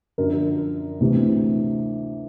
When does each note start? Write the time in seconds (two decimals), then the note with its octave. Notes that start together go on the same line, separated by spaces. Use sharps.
0.18 F#2 D3 F3 A#4
1.00 D2 C3 E3